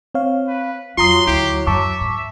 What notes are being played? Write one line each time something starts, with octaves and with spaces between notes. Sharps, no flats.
C4 C#5 F5
B4
F2 F#3 F4 A#5 C6 D#6
D2 E4 G4
F#2 E5 A5 C#6 D6
G#2